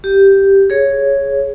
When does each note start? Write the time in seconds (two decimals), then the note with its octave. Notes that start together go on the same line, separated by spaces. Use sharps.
0.04 G4
0.70 G#4 C#5